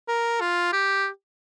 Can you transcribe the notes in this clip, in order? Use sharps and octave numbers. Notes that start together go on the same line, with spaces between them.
A#4
F4
G4